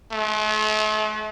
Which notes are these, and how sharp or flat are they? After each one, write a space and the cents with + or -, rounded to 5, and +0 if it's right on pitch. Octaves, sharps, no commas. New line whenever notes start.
A3 -45